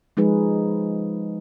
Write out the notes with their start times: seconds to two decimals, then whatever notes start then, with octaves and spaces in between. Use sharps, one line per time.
0.17 F3 G#3 D#4 G#4 B4